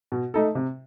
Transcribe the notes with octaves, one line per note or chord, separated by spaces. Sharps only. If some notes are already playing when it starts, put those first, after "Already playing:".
B2
A3 D#4 A4
C3